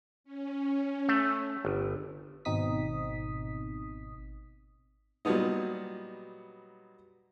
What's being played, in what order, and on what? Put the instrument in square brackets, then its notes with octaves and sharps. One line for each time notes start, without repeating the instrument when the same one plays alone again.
[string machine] C#4
[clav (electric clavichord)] A3
G1
[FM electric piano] G#1 B2 C4 D#4 D#6 B6
[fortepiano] A#2 F#3 G3 B3 D#4